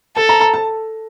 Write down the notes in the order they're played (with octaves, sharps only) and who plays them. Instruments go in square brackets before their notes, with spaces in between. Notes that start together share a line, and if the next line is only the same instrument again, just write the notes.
[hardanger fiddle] A4 [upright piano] A5
[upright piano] A#5
A#5
A5